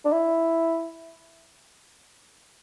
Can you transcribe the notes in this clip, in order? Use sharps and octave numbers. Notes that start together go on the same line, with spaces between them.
D4
E4